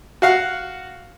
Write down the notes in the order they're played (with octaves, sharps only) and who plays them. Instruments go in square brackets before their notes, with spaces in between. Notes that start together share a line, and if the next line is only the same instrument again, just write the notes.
[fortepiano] F#4 F5 F#5